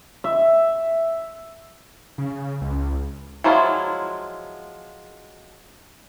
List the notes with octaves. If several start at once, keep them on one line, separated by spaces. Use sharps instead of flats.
E5
C#3
C#2
F3 F#3 G#3 E4 F4